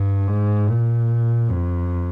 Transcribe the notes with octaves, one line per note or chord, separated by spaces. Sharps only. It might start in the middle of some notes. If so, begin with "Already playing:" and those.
Already playing: G2
G#2
A#2
F2